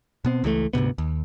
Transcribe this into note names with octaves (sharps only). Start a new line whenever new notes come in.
B2 B3 C4
C#2 E3 F3 A3
D2 G#2 C3 B3
D#2